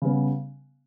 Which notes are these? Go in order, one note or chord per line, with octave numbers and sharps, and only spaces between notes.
C#3 G3 B3